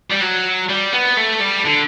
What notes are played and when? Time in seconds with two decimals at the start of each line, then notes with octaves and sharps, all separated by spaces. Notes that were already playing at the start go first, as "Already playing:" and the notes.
0.11 G3
0.22 F#3
0.69 G3
0.93 B3
1.17 A3
1.40 G3
1.65 D3